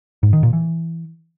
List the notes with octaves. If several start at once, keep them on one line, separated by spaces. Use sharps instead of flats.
G#2
D#3
A#2
E3